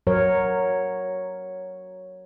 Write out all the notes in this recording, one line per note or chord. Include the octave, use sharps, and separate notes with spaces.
F#3 A#4 C#5